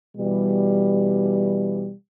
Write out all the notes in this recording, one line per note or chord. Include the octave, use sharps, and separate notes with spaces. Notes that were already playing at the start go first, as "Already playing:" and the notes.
B2 E3 G3